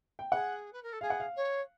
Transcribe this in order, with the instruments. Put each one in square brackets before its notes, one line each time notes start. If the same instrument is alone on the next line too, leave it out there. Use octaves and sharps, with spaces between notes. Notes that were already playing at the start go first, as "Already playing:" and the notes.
[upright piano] G5
[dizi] G#4 [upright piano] F#5
[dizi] B4
A#4
A4
[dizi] G#4 [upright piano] F5
[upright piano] F#5
F5
[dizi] C#5